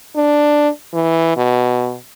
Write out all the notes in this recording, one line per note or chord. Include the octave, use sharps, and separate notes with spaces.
D4
E3
B2